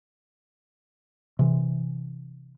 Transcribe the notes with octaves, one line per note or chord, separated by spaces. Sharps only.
C3 E3